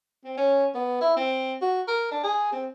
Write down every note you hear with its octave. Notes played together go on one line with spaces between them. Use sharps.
C4
C#4
B3
E4
C4
F#4
A#4
D4
G#4
C4